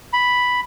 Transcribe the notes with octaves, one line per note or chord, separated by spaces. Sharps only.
B5